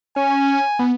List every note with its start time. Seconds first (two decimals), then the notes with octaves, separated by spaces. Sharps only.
0.16 C#4 G#5
0.79 B3